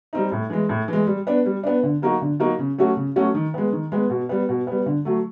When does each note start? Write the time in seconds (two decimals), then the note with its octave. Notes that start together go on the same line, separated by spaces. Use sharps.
0.13 G3 C4 D#4
0.32 A2
0.50 E3 G#3
0.69 A2
0.88 E3 G#3
1.07 G3
1.27 B3 D4
1.46 G3
1.63 B3 D4
1.83 D3
2.02 F#3 A#3 D#4 F#4
2.21 D3
2.40 F#3 A#3 D#4 F#4
2.59 C#3
2.78 F#3 A3 C#4 F#4
2.96 C#3
3.16 F#3 A3 C#4 F#4
3.35 D#3
3.54 G#3 B3
3.72 D#3
3.92 G#3 B3
4.10 B2
4.29 G3 B3
4.49 B2
4.67 G3 B3
4.86 D3
5.05 F#3 A3